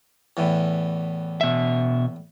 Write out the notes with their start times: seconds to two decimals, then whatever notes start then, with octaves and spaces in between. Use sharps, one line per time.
0.37 E2 A2 E3
1.41 B2 E5